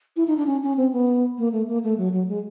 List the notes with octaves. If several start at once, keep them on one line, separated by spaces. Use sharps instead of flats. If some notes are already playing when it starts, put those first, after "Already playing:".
E4
D#4
D4
C#4
C#4
C4
B3
A#3
A3
A#3
A3
F#3
F#3
G#3